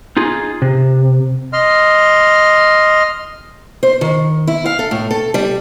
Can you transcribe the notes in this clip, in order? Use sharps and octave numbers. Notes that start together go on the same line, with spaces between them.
D#4 F4 G#4
C3
D#5 C6 F6
C5
D#3
E4
F5
A4
A2
A4
G3